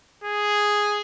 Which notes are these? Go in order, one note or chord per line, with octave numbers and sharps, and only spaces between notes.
G#4